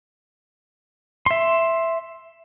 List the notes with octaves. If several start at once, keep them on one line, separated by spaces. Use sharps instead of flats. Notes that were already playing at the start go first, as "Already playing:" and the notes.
E5 C6